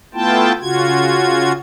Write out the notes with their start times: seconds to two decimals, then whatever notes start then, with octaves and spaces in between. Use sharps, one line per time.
0.14 A3 B3 E4 F4 G5 A5
0.60 C#3 F4 F#4 G#6